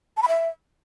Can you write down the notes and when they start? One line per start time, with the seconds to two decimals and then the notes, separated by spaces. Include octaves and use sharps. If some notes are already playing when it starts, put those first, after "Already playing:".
0.17 A5
0.22 B5
0.28 E5